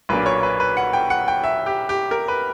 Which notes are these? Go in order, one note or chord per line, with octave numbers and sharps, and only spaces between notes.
B1 A#2 F#3 A#3 D4 B4
C#5
B4
B4
F#5
G5
F#5
G5
E5
G4
G4
A#4
B4